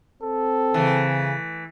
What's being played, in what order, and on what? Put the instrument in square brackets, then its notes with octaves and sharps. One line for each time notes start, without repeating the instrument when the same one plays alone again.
[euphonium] C4 [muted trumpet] A4
[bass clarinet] C#3 [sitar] E3 A3